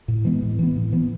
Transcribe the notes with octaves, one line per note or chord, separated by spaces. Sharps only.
A2
E3 G#3 B3
A2
E3 B3
A2
E3 B3